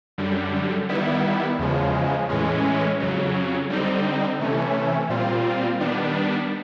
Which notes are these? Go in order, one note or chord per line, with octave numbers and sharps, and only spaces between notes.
F#2 D3 G3
D#3 G3 B3 E4
E2 C#3 F3 G#3
A2 E3 G#3 C#4
F2 C#3 F#3
D3 G3 C4 D#4
C3 E3 A3 C#4
A#2 G3 C4 F4
D#3 G3 B3 D4